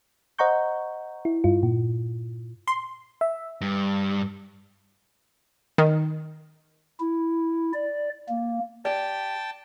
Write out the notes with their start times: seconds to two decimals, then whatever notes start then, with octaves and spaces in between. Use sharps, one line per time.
0.39 C5 D#5 F#5 A#5 C#6 G6
1.25 E4
1.44 G2 F4
1.63 A#2
2.68 C6
3.21 E5
3.61 G2
5.78 D#3
7.00 E4
7.73 D5
8.29 A#3
8.85 G4 D5 G5 A5